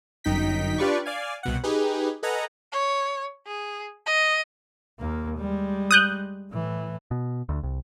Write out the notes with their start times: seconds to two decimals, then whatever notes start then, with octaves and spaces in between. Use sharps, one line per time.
0.24 G1 F#2 D#4 G5 B6
0.78 D4 F4 G4 B4 D5 C#6
1.05 D5 F5 G#5
1.43 C2 B2 F#5
1.63 D#4 G4 G#4 B4
2.23 A4 B4 D#5 F#5 G#5 A#5
2.72 C#5
3.46 G#4
4.06 D#5
4.99 D#2 A#3
5.38 G3 G#3
5.91 D#6 F#6 G6
6.52 A2 E3
7.11 B2
7.49 D2
7.63 C2